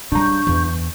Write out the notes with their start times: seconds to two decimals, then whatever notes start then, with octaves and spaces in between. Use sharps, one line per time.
0.12 C#3 G3 D4 A#5 C#6 G6
0.47 E2